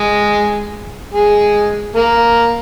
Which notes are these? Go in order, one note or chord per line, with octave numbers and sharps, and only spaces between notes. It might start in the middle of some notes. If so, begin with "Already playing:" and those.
Already playing: G#3 G#4
G#3 G#4
A#3 A#4